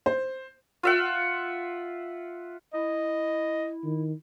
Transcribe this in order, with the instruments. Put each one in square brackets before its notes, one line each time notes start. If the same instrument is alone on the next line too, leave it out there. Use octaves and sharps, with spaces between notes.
[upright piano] C5
[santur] F4 E5 F#5
[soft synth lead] E4 [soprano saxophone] D#5
[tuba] D#3